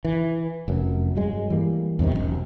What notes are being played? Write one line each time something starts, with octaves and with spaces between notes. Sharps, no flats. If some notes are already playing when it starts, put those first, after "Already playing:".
E3
F1 F#2
G2 F#3 G#3
E3 G3 A#3
E2 G2 C3 D#3
E1 B1 F#2